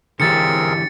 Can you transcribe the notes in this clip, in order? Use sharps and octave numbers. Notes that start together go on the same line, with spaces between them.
D3 E3 C4 G4 G#4 A#4 A6 C#7